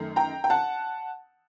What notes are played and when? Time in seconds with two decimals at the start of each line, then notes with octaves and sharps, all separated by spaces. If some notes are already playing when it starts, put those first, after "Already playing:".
Already playing: F#2 D#3 A3
0.16 G5 A#5
0.44 G5
0.50 F#5 A5